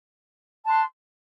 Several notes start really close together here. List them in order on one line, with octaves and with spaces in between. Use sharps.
A5 F#6 C6